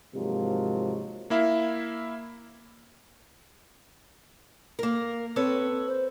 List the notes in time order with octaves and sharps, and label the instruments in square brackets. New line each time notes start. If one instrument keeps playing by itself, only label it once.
[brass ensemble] G#2 C3 F3 F#3 G#3 A#3
[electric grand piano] A#3 E4 E5 F5
[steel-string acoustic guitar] A#3 A#4
[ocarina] C4 [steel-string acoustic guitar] A4 B4 C#5
[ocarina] C5